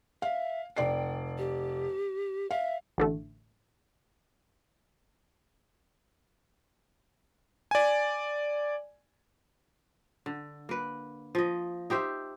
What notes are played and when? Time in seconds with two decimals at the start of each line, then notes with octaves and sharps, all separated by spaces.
0.22 E5 F5
0.77 F1 D5 G5 C7
1.38 G4
2.51 E5 F5
2.98 A1 D3 A3
7.71 D5 G#5
10.26 D3
10.69 A#3 B4
11.35 F3 D#5
11.90 D#4 G4 C5 E5